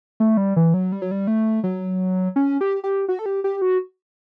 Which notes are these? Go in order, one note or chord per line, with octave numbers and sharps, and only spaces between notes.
A3
G3
E3
F#3
G3
F#3
G3
A3
F#3
C#4
G4
G4
F#4
A4
G4
G4
F#4